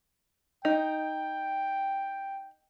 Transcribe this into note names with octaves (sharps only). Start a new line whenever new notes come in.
D#4 G5